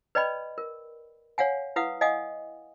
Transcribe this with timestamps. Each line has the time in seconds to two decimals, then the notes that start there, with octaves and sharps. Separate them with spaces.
0.15 B4 D5 D#5 G5 B5
0.58 A#4
1.38 C#5 F5 F#5 G#5
1.76 E4 B4 F5 F#5 D#6
2.01 D#5 F5 F#5 G#5 D#6